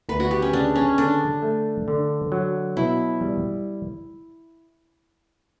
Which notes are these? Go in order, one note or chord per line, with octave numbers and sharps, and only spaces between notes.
D2 B4
F#4
G4
C#4
C#3 D4
C#4
D3 D4
A3
D3
F#3
B2 E4
G3